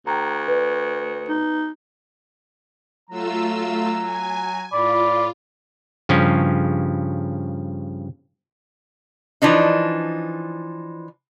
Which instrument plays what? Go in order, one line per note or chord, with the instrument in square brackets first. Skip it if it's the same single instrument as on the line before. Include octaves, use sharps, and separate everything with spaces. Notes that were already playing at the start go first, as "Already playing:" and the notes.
[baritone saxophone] D2 [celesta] G5 A#5
[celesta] B4 D5
[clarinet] D#4
[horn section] F#3 A#5 [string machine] A3 F4 E6
[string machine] G#5
[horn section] A2 B5 [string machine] F4 [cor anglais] D5
[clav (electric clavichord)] G2 C#3 F3 C#4
[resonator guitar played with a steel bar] E3 F3 D4 D#4